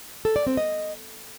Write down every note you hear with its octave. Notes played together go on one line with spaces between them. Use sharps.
A4
D5
C4
D#5